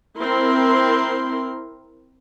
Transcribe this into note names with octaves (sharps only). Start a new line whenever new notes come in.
C4 E4 A#4 C6